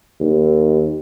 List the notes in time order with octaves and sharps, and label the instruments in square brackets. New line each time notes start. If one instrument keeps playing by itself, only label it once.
[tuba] D#2